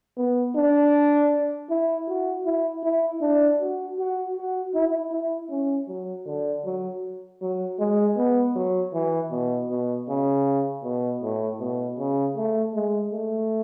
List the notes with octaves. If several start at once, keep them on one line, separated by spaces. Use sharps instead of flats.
B3
D4
E4
F#4
E4
E4
D4
F#4
F#4
F#4
E4
E4
C#4
F#3
D3
F#3
F#3
G#3
B3
F#3
E3
B2
B2
C#3
B2
A2
B2
C#3
A3
G#3
A3